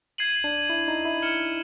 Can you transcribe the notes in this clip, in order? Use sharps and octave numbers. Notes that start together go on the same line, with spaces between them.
G#6 C7 D#7 F#7
D4
E4
D#4
E4
F6 G#6 C#7 E7 G7